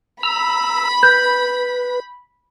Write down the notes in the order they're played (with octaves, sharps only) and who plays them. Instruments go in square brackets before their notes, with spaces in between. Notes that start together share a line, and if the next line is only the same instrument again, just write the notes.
[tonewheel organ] A#5 E6 [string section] B5
[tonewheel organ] B4 [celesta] G6